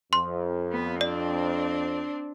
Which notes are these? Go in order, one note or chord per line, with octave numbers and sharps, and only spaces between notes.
F2 C6
B3
C4 D4 D5